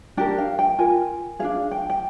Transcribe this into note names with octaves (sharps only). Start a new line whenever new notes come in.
D4 G4 A#4 G5
F5
G5
F4 A#4 G#5
D4 F4 G#4 F5
G5
G5